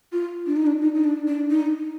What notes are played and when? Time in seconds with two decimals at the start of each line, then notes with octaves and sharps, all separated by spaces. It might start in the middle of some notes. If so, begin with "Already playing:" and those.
0.12 F4
0.47 D4
0.57 D#4
0.67 D4
0.81 D#4
0.95 D#4
1.04 D4
1.27 D4
1.50 D#4